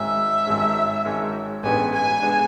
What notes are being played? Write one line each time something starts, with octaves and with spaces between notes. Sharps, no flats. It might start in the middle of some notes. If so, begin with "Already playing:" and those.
Already playing: G#1 G#2 G#3 C#4 E5
G#1 G#2 G#3 C#4
G#1 G#2 G#3 C#4
A1 G#2 G#3 B3 D4 G#5
G#5
G#3 B3 D4